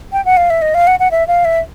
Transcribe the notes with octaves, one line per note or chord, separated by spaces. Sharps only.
G5
F#5
F5
E5
D#5
F5
F#5
F#5
E5
F5
E5